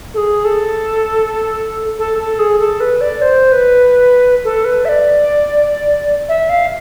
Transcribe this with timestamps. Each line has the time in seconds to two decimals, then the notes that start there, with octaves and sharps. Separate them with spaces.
0.14 A4
0.17 G#4
0.45 A4
1.99 A4
2.19 A4
2.39 G#4
2.59 A4
2.80 B4
3.01 D5
3.22 C5
3.52 B4
4.44 A4
4.65 B4
4.85 E5
4.89 D5
6.29 E5
6.49 F5